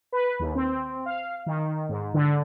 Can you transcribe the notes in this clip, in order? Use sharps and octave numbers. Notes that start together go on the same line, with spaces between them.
B4
D#2
C4
F5
D#3
G#2
D3